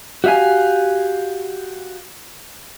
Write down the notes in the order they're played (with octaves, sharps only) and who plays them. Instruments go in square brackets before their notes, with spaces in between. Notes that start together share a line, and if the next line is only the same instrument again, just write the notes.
[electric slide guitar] F#4 G4 E5 F5 G#5